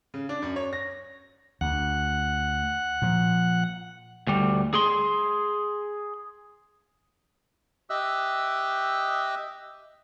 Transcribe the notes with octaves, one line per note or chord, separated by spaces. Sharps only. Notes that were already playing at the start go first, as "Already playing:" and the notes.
C#3
D4
F#2
C#5
A#6
D2 F#5
A#2 F3
D2 G3
G#4 C6
G4 D#5 E5 E6 F#6